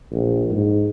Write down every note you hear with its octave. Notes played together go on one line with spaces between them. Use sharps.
A#1
G#2